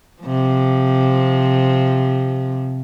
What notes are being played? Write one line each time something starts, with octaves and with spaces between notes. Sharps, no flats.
C3 F3